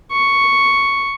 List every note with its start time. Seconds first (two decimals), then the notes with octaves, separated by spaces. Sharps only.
0.13 C#6